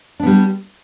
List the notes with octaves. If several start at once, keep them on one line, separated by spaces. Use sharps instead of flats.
G3 B3 D4